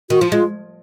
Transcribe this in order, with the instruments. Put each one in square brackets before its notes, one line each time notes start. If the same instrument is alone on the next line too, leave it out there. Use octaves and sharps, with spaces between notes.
[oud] D#3 [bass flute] F#4
[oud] F3 [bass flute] F4
[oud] G#3 [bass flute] F4